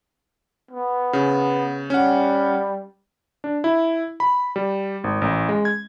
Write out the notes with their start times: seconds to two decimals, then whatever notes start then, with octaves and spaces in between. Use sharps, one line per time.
0.71 B3
1.13 C#3
1.90 G3 C#4 F#5
3.44 D4
3.64 E4
4.20 B5
4.56 G3
5.04 G#1
5.22 A1
5.49 G#3
5.65 G#6